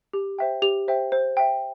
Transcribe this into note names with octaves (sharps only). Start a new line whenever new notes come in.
G4
C5 E5 G5
G4 F7
C5 E5 G5
C5
E5 G5